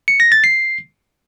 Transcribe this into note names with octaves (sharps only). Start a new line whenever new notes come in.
C#7
A#6
A6
C7